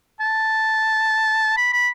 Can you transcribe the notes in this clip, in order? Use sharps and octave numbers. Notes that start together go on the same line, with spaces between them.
A5
B5
B5